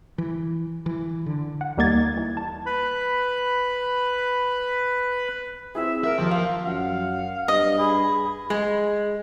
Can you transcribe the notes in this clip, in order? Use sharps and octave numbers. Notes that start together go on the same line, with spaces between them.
E3
E3
D3
F#5
D#2 G3 A#3 D#4 G#6 A6
E3
A5
B4 B5
C4 E4 G#4 E5
A#4 E5
D#2 F3
F5
F#2 F5 F#5
G2 D#5
G#4 B5
G#3